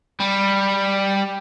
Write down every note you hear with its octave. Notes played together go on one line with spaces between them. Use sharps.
G3